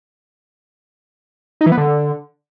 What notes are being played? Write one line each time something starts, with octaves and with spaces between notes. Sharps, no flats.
D#4
E3
B3
D3